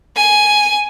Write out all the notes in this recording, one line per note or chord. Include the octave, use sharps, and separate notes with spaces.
G#5